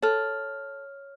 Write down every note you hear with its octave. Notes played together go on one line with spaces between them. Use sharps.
A4 C#5 F6